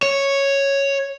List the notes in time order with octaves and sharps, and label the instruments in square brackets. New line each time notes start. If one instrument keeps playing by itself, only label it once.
[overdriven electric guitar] C#5